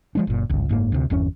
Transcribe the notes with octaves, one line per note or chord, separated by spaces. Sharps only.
F3 G#3 D4
F#1 A#2
G1 C#2
F#1 G#2 A#3
D2 C3
G1 E2 C#4